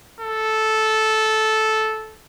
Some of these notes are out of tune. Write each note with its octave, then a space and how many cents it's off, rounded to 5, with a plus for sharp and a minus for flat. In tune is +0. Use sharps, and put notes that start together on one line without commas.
A4 -10